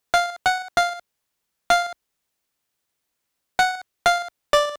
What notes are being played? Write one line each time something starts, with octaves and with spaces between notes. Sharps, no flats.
F5
F#5
F5
F5
F#5
F5
D5